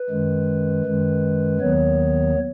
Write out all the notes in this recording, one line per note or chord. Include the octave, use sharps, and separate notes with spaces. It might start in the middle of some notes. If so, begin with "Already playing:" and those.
Already playing: B4
F#2 D#3 G#3
F#2 D#3 G#3
D#2 D#3 F#3 B3 C#5